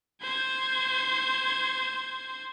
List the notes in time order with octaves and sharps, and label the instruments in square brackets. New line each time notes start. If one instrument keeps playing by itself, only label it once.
[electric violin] C5 G#6